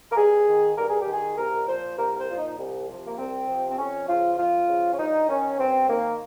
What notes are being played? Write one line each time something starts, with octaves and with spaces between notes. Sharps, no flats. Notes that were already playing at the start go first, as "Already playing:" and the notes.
A#4
G2 G#4
D#3
G2 A#4
G#4
G4
D#3
G#4
C2 A#4
A#2 F3 C5
C2 A#4
A#4
C5
A#2 F3 F4
D#4
C2
C3 F3
A#3
C2 C4
C3 F3
C4
F2 C#4
C#3 F3 F4
F2 F4
C#3 F3
C#4
G2 D#4
D#3 C#4
G2 C4
D#3 A#3